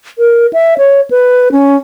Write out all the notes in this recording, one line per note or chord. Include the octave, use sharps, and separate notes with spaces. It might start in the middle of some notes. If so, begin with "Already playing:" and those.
A#4
E5
C#5
B4
C#4